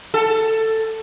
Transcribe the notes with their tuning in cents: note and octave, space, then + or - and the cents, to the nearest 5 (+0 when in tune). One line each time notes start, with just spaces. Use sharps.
A4 +10